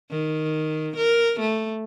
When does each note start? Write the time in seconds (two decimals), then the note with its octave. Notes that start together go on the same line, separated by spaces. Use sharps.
0.11 D#3
0.97 A#4
1.41 A3